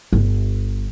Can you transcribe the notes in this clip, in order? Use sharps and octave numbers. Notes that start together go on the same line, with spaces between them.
G1